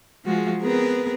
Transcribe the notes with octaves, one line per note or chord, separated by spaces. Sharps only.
F3 G#3 F4 F#4 G#4
B3 C4 G#4 A#4 B4